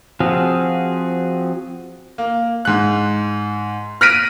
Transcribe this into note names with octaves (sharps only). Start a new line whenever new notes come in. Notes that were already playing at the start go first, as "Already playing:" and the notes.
F3 C4 F#4 G#4 F5
A#3
G#2 F#6
F6 F#6 A#6 B6 D7 D#7